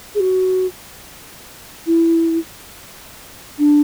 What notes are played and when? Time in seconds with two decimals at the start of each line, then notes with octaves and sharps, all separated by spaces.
0.15 G#4
0.20 F#4
1.86 E4
3.58 D4